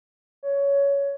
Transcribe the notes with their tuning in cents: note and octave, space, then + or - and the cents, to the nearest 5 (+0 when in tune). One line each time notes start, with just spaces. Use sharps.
C#5 +15